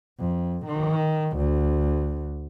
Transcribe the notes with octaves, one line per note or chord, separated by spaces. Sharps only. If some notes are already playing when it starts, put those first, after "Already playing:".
F2
D#3
D2